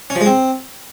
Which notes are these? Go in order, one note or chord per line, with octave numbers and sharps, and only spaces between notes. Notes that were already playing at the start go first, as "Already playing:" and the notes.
C#4
F3
G#3
C4